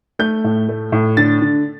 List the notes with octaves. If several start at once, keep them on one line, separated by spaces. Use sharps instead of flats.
A3 G6
A2
A3
A2
D3 A6
D3